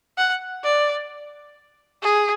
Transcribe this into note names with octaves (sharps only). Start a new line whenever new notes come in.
F#5
D5
G#4